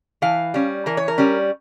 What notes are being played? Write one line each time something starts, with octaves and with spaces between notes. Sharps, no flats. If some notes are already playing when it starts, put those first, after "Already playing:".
E3 F5
G3 C#4
E3 A#4
C#5
A#4
G3 C#4